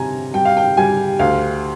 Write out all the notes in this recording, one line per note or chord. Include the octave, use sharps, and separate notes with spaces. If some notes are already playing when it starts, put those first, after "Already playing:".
Already playing: C3 G3 G#5 A#5
G3 G5
F5
G5
G3 G#5
D2 F5